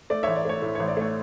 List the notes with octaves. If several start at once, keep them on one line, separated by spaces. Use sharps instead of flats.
A3 D5
A1 C#5 E5
D5
A3 C#5
A2
A1 C#5
D5
A3 C#5